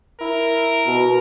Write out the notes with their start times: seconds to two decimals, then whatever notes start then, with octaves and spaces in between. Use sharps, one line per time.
0.21 E4 A#4
0.87 B2